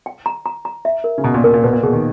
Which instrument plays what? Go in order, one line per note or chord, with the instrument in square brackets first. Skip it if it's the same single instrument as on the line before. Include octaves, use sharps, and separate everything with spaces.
[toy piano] G5
A#5
A#5
A#5
E5
A#4
[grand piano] C#3
[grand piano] B2 [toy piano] A#5
[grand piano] A#2
[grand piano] B2 [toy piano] A#4
[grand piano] A#2
[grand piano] B2 [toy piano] B4
[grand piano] A#2
[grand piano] B2 [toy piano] G#4
[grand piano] D#3